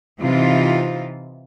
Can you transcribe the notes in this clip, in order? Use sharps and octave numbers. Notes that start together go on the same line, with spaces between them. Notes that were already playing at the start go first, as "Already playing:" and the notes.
C3 E3 C4 D#4 F4